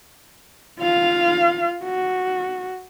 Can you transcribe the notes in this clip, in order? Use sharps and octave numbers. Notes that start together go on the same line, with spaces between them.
F4 F5
F#4